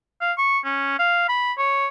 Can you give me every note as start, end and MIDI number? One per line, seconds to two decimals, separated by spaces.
0.21 0.32 77
0.38 0.59 85
0.65 0.96 61
0.99 1.26 77
1.29 1.53 83
1.58 1.87 73